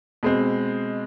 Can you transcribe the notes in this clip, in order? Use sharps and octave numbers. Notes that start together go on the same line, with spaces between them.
B2 G#3 C4